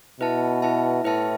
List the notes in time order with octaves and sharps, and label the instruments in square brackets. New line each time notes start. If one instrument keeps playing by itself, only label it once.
[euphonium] B2 [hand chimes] E4 B4 E5 A5
[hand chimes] E4 B4 E5 A5
[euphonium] A2 [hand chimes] E4 B4 E5 A5